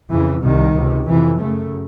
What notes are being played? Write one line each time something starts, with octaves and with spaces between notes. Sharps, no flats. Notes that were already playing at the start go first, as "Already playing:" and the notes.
F2 C#3 E3
C2 C3 D#3
C#2 C3
F2 C3 E3
F#2 C#3 A3